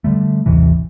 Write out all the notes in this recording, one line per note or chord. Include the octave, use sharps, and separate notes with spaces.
D3 G3 A3
A1 D#2 C3 E3